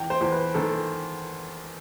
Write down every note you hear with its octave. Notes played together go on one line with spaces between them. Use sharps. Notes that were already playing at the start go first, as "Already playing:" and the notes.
Already playing: E2 G5
C5
E2
B4
D#3 A4